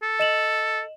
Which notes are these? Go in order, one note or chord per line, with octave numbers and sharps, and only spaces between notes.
A4
D#5 E7 F#7